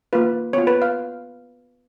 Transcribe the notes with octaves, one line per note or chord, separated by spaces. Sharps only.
A#3 F4 B4
B3 F4 C#5
B4
F5